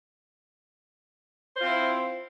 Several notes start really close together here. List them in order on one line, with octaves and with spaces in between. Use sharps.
C5 F4 C4 E4